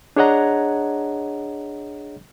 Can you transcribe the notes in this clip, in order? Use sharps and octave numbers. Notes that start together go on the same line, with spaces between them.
D4 G#4 C#5 D#5 F#5 A#5